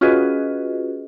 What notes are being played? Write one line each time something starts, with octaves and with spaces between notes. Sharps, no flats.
C#4 F4 F#4 G#4 B4 D#5